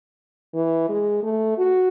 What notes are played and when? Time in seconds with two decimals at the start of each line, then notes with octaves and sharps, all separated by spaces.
0.55 E3
0.89 G#3
1.23 A3
1.58 F#4